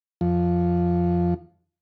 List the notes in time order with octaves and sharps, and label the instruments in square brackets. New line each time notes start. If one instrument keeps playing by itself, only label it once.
[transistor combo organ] F2 F3